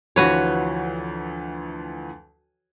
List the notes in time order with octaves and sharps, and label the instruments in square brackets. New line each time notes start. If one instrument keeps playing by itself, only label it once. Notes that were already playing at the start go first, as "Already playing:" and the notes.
[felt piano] D2 E3 F3 [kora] F#4 B4 C#5